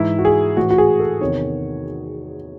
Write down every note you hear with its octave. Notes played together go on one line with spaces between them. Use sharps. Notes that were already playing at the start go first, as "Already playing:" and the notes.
Already playing: G#2 E3 E4
F#4
G#4
A2 E3 F#4
F#4
G#4
A4
E2 C3 D#3 C#5